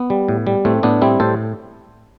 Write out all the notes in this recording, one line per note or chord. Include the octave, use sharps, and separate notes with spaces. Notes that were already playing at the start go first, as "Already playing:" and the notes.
Already playing: B3
G3
A2
G3
A2 A3 C4
A2 B3 D4
G3 C4 E4
A2 A4 C5